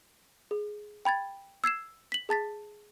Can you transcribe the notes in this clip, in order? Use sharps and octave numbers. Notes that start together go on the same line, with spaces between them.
G#4
G5 B5 G#6 A6
E6 G#6 C7 E7
B6 F#7
G#4 A5 A6 B6